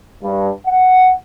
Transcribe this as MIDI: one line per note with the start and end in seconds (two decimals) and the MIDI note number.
0.23 0.49 43
0.67 1.11 78